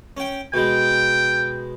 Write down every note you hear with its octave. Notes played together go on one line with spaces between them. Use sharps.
C#4 G5
B2 G#3 G5